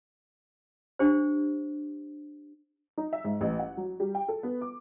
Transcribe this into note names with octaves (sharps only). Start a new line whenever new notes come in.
D4 G4 C5
D#4
E5
G#2
A1
F#5
F#3
G3
G5
A4
B3
D6